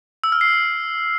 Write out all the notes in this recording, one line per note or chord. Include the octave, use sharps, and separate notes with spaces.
E6
F6
C7